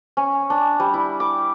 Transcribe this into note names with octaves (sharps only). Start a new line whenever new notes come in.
C#4
D4
G3
E4
D6